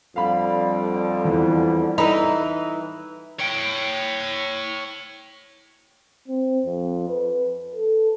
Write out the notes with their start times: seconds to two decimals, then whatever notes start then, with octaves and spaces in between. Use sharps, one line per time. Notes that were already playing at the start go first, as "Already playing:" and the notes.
0.16 F2 D3 G3 F5 B5
1.25 E2 E3
1.98 E3 D#4 B5
3.39 C#5 G5
6.28 C4
6.66 F2
7.09 B4
7.75 A4